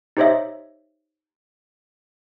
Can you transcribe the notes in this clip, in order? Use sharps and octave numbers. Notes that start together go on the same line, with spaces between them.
D#4 G4 C5 C#5 D#5 E5